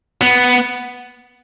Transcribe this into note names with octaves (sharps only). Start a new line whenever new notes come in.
B3